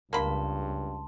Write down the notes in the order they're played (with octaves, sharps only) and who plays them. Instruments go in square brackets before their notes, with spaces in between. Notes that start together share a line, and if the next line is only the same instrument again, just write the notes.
[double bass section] C#2 [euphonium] G2 [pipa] A#3 B5 [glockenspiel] A5 C6